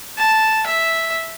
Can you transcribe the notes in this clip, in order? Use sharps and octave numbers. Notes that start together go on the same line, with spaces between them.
A5
E5